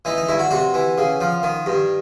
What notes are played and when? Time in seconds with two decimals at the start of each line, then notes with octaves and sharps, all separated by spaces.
0.05 E3 D#4
0.17 D#4
0.29 G2 E4
0.39 F#4
0.51 C3 F#4
0.74 E3
0.98 C#3
1.21 F3
1.43 D#3
1.66 G2